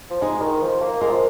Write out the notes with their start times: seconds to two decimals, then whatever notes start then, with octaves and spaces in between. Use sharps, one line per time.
0.10 F3
0.22 G#3 D#4 G#4
0.41 D#3
0.62 F3
0.82 A#3
1.01 G#3 F4 A#4
1.11 F3